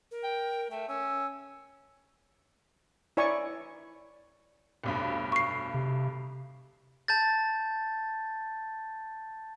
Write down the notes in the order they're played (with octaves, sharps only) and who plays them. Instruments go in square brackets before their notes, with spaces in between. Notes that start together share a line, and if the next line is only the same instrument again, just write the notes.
[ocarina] A#4
[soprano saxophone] G5
[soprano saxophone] A3 [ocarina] G5
[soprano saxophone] C#4 [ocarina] E6
[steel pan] E4 C#5 D5 G#5 C#6
[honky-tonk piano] F1 B1 G2
[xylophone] C#6 C7
[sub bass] C3
[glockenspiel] A5 G6 A6